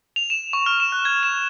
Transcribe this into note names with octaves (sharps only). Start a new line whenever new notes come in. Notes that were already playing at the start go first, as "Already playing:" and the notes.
F7
E7
C#6
F6
E7
F#6
G#6
E7